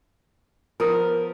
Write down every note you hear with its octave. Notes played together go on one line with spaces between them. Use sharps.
F3 B3 A#4 D#6